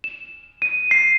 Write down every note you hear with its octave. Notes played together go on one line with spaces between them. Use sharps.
E7
D#7
C7